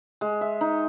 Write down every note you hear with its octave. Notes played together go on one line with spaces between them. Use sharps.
G#3
E5
D#4